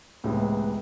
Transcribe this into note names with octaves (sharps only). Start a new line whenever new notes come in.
C#2 A2 C3 E3 G#3 B3